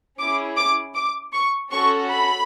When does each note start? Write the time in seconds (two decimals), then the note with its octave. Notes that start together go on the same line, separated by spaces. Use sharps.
0.18 C#4 E4 G#4 D6
0.56 D6
0.94 D6
1.33 C#6
1.71 C#4 F#4 A4 C#6
2.10 B5